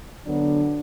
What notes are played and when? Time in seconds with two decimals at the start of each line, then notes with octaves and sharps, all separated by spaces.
0.25 D3 F#3 B3 D4